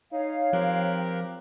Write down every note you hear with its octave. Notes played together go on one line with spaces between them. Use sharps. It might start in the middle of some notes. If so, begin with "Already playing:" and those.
D#4 C#5 F5
F3 C4 G4 A#4 F#6